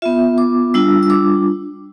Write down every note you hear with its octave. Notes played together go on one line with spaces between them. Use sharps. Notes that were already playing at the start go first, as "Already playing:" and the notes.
B3 F4 E5
D6
G3 D4 F4 E6
E6
D6